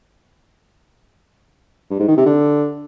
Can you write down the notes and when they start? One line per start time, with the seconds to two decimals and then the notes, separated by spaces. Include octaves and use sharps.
1.90 G2
1.99 G#2
2.08 D#3
2.17 C3
2.26 D3